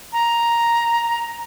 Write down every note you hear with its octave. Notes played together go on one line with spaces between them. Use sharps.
A#5